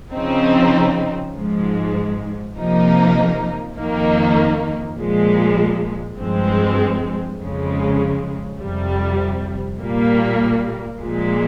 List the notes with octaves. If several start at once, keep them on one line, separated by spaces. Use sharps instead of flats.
C#3 F3 C4 D#4
G#2 F3 G#3
C3 F3 A#3 D#4
F2 D#3 A#3 D#4
A#2 F3 G#3
G2 F3 G#3 C4
F2 C#3 G#3
F2 C3 G3
A#2 G3 A#3
A#2 F3 G#3